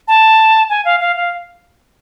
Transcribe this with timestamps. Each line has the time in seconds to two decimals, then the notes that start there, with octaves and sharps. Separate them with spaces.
0.08 A5
0.70 G#5
0.85 F5
1.00 F5
1.16 F5